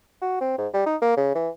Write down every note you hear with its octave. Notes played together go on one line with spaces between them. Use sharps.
F#4
C4
G#2
G3
D#4
A#3
C#3
E3